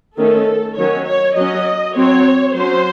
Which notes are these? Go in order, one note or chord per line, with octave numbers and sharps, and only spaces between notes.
D#3 A3 C#4 A4
D#3 F#3 C#4 C#5
C#5
F#3 C#4 D#5
F#3 C4 C#5
F#3 C#4 C5